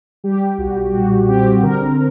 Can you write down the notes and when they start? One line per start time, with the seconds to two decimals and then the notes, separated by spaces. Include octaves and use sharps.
0.24 G3 G4
0.58 B1 F#4
0.93 A#2 F#4
1.28 C4 G4
1.63 D3 A#4